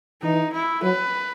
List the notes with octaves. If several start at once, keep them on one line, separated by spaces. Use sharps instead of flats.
E3 D#4
E4
F#3 B4